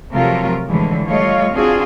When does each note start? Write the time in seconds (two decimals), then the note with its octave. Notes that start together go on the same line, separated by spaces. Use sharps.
0.12 C3 F3 F#3 A3 F4 A#4
0.66 A2 D3 E3 F3 G3 G#3
1.07 G3 A3 F4 C#5 D#5 F5
1.52 C4 D4 F4 F#4 G#4